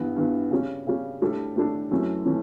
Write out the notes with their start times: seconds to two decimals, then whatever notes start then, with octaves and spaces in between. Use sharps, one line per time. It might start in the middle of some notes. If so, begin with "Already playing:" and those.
Already playing: G2 E3 B3
0.16 G2 E3 B3
0.51 C#3 G3 C#4
0.87 C#3 G3 C#4
1.21 A2 G3 D4 A4
1.56 A2 G3 D4 A4
1.91 F#2 E3 A3 C#4
2.26 E3 A3 C#4